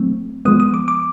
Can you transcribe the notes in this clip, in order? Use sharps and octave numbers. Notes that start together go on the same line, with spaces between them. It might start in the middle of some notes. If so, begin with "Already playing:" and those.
Already playing: F#3 A3 C4
F3 G#3 B3 D#6
D#6
D6
D6